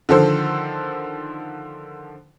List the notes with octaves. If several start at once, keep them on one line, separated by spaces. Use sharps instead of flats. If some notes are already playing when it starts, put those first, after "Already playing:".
D3 D#3 F3 A4 C5